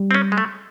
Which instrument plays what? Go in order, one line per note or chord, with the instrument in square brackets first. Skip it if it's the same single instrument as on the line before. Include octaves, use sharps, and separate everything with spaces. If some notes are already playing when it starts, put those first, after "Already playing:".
Already playing: [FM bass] G3
[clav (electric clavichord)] C4
C#4
G#3
A3